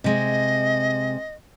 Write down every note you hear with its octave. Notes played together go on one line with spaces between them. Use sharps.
C3 G#3 D#5